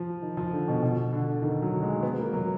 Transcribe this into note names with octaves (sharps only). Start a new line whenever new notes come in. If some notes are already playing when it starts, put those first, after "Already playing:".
Already playing: F3
D#3
F3
D3
B2
B2
D3
D#3
F#3
G#3
B3
A#3
F#3